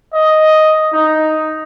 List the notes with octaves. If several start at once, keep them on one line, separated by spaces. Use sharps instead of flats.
D#5
D#4